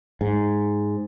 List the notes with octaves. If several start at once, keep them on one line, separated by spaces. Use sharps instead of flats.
G#2